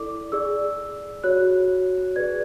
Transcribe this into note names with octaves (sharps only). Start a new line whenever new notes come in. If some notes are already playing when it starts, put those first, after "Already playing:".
Already playing: E4 A4 D5 D6
G#4 D5 E6
F#4 C#5 F#6
G#4 B4 D5 G#6